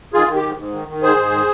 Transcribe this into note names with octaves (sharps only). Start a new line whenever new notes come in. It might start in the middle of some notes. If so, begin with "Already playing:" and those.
D#3 F4 G#4
D#3
G4
G#2
G#2
D#3
D#3
G#2 G#4 C5
G#2
D#3